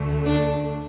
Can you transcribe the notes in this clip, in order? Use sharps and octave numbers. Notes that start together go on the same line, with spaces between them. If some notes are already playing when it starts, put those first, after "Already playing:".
Already playing: D2 D3 A3
D4